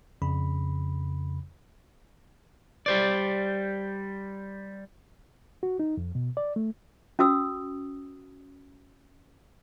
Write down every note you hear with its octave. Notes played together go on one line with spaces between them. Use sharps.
F2 C#3 B5
G3 C5 D5
F#4
D#4
F2
B2
D5
A3
C#4 F#4 D#6 E6